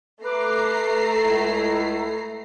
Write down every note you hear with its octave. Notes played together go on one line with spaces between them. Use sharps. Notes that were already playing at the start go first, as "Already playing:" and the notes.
A3 B4 A#5 D6 C7
C#2 E4